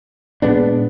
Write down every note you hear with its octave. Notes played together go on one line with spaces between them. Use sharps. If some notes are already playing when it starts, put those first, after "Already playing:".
A#2 G#3 B3 D4